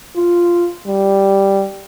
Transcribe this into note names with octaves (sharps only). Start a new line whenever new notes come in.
F4
G3